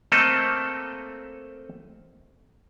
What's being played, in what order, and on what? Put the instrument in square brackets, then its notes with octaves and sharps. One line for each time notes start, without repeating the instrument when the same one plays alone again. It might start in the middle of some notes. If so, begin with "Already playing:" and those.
[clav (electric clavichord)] A3 A#3 C4 A4 D#5